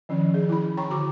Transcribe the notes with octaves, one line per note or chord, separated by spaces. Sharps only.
D#3 F3 C#4
G#4
E4 B5
C#5 G5 A#5 C#6
D3 F#4 D6